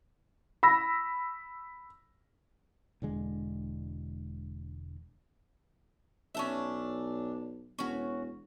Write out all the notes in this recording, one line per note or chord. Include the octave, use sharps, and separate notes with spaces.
B5 E6 A#6
E1 D3 G#3
B1 C#4 D4 E5
E1 C#4 F#4